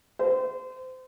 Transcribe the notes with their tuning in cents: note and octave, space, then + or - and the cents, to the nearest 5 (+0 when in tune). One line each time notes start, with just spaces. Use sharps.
C5 -30